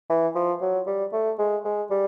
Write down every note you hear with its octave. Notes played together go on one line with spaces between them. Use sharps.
E3
F3
F#3
G3
A3
G#3
G#3
G3